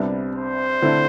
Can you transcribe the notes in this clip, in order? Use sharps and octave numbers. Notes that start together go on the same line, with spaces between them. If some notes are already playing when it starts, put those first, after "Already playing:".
Already playing: C2 C3 G3 B3 D4
C5
D3 A3 C4 E4